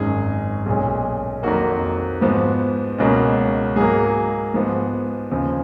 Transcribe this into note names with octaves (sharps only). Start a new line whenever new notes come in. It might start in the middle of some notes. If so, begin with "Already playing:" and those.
Already playing: G#1 F#2 D#3 G#3 G#4
B1 A#2 G#3 C#4
F2 D#3 F#3 A#3 F#4
G#2 F3 B3
C#2 B2 A#3 C#4
G#2 F#3 A#3 G#4
G#2 F3 B3
D#2 C#3 F3